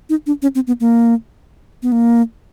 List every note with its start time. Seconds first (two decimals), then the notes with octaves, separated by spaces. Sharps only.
0.09 D#4
0.26 D4
0.42 C#4
0.55 C4
0.67 B3
0.80 A#3
1.83 B3
1.92 A#3